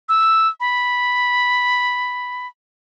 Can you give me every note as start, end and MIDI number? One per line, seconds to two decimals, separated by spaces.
0.09 0.48 88
0.60 2.47 83